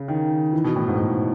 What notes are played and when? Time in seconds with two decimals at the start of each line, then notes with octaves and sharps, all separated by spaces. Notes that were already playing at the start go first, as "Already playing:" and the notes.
Already playing: C#3
0.08 D#3
0.53 E3
0.64 B2
0.76 A2
0.88 G#2
0.98 G#2